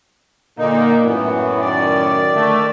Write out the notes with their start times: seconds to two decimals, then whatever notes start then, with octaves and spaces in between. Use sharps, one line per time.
0.59 A#2 D3 A#3 D#4
1.05 F#2 A2 E3 B3
1.62 D#3 D5
2.33 D3 A3